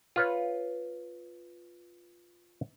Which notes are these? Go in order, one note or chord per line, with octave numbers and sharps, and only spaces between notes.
F4 B4 C#5